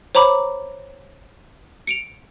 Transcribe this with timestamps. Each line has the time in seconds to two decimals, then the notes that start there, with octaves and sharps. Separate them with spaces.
0.15 C5 C#5 A#5 B5 D6
1.87 C#7 D7 F7